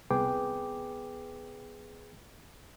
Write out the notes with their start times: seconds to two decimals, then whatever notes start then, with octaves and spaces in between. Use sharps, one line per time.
0.10 C2 B3 G#4 B4 G5 D6